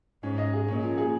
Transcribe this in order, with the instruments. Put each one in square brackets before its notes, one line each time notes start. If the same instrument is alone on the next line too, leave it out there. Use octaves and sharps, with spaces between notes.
[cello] G#2 [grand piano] C#4
[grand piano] D#5
G#4
[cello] A#2 [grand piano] C#4
[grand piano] F3
G#4